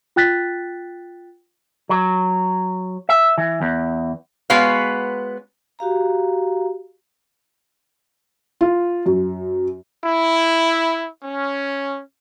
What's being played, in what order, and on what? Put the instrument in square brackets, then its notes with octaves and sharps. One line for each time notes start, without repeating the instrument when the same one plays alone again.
[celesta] F4 G5 F#6 A6 B6
[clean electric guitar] F#3
E5
E3
E2
[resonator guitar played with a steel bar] G#3 B3 F#4 B4 C#5 F5
[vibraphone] F#4 G4 F5 A#5
[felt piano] F4
F#2
[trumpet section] E4
C#4